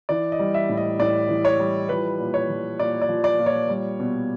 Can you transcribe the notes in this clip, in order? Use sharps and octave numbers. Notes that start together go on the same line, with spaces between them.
E3 D5
D#5
G3
E5
A2
D#5
A2 D5
E3
C#5
G3
F3 B4
A#2
C#5
F3
A#2 D5
D5
F3
D5
A#2
C#5
G3
B2